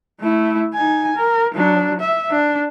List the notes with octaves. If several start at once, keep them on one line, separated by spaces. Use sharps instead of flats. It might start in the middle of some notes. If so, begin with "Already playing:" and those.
A3 E4
D#4 G#5
A#4
F#3 D4
E5
D4